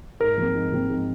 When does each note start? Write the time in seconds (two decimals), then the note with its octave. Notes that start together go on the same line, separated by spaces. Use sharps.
0.20 G#2 A#4
0.37 F3 C4
0.55 G#2
0.72 F3 C4
0.89 G#2